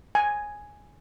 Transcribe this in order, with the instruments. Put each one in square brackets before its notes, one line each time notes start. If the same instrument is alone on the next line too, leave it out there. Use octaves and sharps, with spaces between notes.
[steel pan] G#5